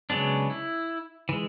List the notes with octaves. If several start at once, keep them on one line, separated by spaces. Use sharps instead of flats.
C#3 F#3 G#3 B3 D4
E4
E3 G#3